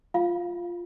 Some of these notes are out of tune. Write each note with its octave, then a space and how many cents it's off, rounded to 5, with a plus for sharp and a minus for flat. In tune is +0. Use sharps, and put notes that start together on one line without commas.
F4 +0 F5 +0